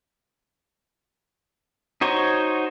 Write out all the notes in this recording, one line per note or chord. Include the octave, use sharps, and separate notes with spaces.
D#4 F#4 C5 C#5